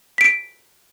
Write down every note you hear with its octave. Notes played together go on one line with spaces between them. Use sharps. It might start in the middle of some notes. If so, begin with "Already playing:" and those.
B6 D7